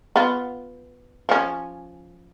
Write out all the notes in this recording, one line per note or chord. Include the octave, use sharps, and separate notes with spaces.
B3 F4
F3 C#4